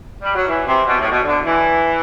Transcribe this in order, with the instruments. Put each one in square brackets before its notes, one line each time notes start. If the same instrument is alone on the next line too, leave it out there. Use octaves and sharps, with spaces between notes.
[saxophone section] G3
F#3
E3
C3
B2
A2
B2
D3
E3